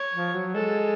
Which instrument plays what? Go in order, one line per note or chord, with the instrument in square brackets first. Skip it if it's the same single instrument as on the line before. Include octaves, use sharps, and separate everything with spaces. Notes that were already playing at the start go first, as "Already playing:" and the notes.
Already playing: [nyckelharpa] C#5
[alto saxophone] F3
F#3
[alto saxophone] G#3 [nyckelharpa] A4